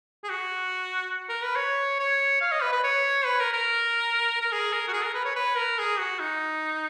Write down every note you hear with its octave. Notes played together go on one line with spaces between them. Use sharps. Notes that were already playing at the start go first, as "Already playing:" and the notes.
G#4
F#4
A#4
B4
C#5
C#5
F5
D#5
B4
B4
C#5
B4
A#4
A#4
A#4
G#4
A#4
F#4
G#4
A#4
B4
C#5
B4
A#4
G#4
F#4
D#4